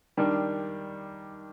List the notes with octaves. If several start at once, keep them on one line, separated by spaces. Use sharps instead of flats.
D#3 G3 D4